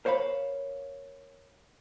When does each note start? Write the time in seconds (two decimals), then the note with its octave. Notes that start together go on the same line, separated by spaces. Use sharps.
0.05 A#4 C5 C#5 F5 B5